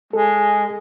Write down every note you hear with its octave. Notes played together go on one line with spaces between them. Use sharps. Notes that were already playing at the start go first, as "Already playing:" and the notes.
G#3 A4